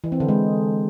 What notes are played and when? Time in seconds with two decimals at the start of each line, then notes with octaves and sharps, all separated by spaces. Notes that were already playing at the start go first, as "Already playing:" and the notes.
0.04 E3
0.12 C4
0.20 D3
0.29 G#3